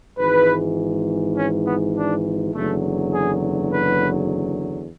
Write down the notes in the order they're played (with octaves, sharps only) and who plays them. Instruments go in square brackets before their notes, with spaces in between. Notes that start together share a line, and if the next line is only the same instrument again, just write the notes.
[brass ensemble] G#1 G#2 E3 B4
C#4
B3
D4
F#1 E2 D3 F#3 A3
G#4
B4